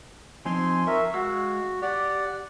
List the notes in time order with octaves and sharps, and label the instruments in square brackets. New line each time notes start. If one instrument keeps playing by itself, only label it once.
[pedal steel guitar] F3 C4 D#4 [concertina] G#5 C6
[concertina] A#4 E5 [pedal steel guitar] C#6
[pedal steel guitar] G#3 F5 E6 [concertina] F#4
[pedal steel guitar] G4 [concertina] D5 F#5